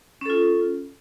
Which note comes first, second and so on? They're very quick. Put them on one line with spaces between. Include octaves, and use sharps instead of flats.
C#4 A4 F4